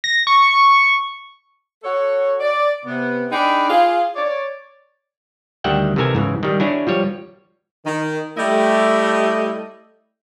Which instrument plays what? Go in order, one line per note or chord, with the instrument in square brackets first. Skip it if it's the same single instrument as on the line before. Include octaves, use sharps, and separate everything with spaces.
[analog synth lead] A#6
C#6
[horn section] F#4 A4 C#5
D5
C3 B3
D4 D#4 G#4 G5 B5
F4 G#4
C#5 D5
[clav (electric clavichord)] D2 D#3 G3 E5 F#5 G5
C3 D#3 E3 A4 A#4 G#5
G#2 C#3 E3
D#3 G3
D4 E4 F#4 G#4 C#5
F3 G3 C#5
[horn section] D#3
G3 A3 E4 G4 D#5